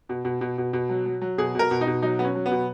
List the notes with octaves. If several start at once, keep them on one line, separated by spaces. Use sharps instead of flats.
B2
B2
B2
B2
B2
F#3
F#3
F#3
B2 G#4
B2 A#4
B2
D#4
B2
F#3 D#4
F#3 B3
C#4
F#3
B3
B2